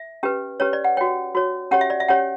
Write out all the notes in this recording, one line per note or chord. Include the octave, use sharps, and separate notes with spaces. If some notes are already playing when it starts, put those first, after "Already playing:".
Already playing: E5
C#4 G4 B4
C#4 G4 B4 C#5
D5
F#5
F#4 C#5 G5
F#4 C#5
C#4 G4 C#5 F#5
E5
D5
E5
C#4 G4 C#5 F#5